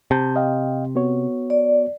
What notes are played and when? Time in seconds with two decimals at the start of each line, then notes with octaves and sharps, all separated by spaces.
0.11 C3 A5 G6
0.36 D#5 F5 G5
0.95 B3 F#4 C#5
1.50 D5